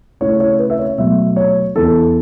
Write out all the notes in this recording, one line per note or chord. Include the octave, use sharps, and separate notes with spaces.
C#3 A3 C#4 E4 C#5
C#5
B4
E5
C#5
B2 F#3 A3 E5
C#5
E2 E3 B3 E4 A4